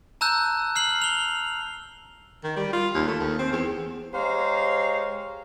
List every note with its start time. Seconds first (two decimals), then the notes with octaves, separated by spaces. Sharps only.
0.21 A5 A#5 E6 F#6 G6
0.76 F6 C7 F#7
1.02 F7 G7
2.44 D#3
2.56 G3
2.73 F4
2.95 D#2
3.08 A3
3.20 D#2
3.39 C4
3.52 E2
4.13 G#3 G4 C5 C#5 F5 A#5